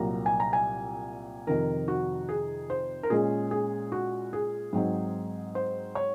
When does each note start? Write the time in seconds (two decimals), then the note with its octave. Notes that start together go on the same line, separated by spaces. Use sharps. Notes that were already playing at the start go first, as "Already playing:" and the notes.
Already playing: C2 A#2 F#3 A#3 A#5
0.26 G#5
0.40 A#5
0.53 G#5
1.47 F2 C3 D#3 A#4
1.88 F#4
2.29 G#4
2.70 C5
3.03 A#4
3.10 A#2 G#3 C#4 G#4
3.51 G#4
3.92 F#4
4.33 G#4
4.73 G#2 F#3 C4 D#4
5.55 C5
5.95 C#5